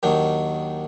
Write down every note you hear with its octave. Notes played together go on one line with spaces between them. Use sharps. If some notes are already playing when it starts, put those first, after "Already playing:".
D#2 D#3 F#3 D4